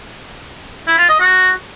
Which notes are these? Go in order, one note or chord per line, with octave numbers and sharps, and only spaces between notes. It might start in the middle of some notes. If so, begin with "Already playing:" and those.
E4
F4
D#5
F#4